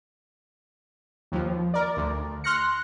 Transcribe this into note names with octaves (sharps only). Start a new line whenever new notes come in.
D#2 F3
A#4 D5
D2
C6 F6 F#6 A#6 C#7